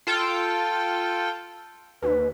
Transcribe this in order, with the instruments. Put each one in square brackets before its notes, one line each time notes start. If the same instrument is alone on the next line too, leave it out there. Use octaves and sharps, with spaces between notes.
[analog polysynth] F4 A4 G5
[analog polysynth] D#2 [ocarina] B4